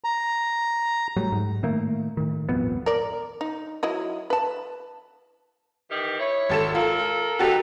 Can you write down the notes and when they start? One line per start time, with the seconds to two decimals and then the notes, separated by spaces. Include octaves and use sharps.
0.04 A#5
1.16 A2 F#3 G3
1.32 G#2
1.63 A2 D#3 A3 A#3
2.17 A2 D#3
2.49 D#1 G#1 F2 B3
2.86 A#4 D5
3.41 D#4
3.83 F#3 E4 D#5
4.30 B4 A5
5.89 D#3 E3 G4
6.20 E4 C#5
6.49 G#1 A4 E7
6.75 F4 A4 A#4
7.39 D#4 F#4 G4 A4 B4